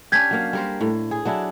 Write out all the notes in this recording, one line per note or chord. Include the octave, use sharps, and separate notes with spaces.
C#4 D4 G4 G6 G#6 B6
F#3 A#3 F5
G3 A#4 C5
A2
G#4
F#3 D4 E4